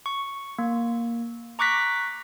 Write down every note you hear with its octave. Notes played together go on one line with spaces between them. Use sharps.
C#6
A#3
A#5 C#6 D6 F#6 A#6 B6